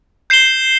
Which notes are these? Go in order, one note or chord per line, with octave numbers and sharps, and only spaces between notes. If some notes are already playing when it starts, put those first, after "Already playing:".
G6 C7 E7 G7